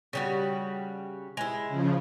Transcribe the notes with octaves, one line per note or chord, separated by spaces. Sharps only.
C#3 G3 F#4
G#3 E4
C#3 F3